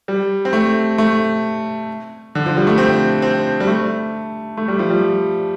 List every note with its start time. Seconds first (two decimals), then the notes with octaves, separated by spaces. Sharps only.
0.08 G3
0.45 C4
0.53 A3
0.98 A3
2.35 D3
2.46 F3
2.57 G3
2.67 A3
2.78 C4
3.22 C4
3.60 G3
3.67 A3
4.57 A3
4.68 G3
4.79 F3
4.90 G3